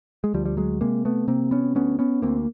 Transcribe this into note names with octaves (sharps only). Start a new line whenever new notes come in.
G#3
D2 F3 G3
G3
F#3 G#3
C3 G#3 A#3
A3 B3
C3 A#3 C4
B3 C#4
D2 B3 C#4
B3 C#4
D2 A#3 C4